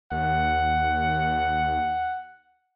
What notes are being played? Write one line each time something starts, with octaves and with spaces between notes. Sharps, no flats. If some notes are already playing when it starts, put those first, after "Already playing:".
D#2 F#5